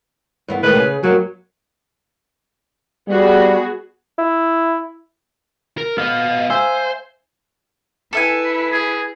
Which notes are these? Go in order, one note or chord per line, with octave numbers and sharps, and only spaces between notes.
G2 E3 B3
A2 D#3 G#3 B4
C#3 G#4
G2 F#3 A#3
G3 B3 F#4 G#4
E4
A#4
B3 D#5 F5
C5 E5 G#5
E4 A4 B4 E5 G#5
G#4